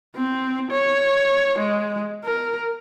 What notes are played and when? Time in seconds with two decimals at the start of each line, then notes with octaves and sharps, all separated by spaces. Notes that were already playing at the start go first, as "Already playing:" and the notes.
0.16 C4
0.72 C#5
1.59 G#3
2.25 A#4